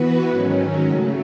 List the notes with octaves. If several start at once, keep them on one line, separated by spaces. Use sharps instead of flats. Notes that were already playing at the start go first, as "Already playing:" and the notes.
Already playing: E3 B3 F#4 B4
G#2 D#3 F#3 C#4
C#3 F#3 A3